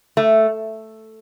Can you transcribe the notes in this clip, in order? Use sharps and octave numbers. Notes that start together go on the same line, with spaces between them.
A3